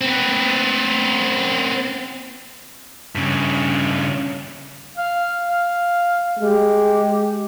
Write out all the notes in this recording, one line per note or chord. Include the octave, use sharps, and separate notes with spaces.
B3 C4
G2 C#3
F5
F5
G#3 G4